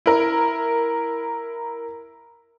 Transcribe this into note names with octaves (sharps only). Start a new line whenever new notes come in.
E4 A#4